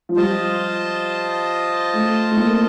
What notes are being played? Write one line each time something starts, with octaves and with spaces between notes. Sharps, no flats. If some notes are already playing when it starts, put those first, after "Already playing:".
F3
G3 F4 C5 D#5 A5
A3
A3
A#3